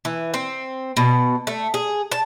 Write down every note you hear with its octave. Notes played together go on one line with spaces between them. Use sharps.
E3
C4
B2
A3
G#4
A5